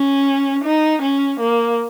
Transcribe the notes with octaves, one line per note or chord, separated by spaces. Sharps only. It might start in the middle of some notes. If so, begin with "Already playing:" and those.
Already playing: C#4
D#4
C#4
A#3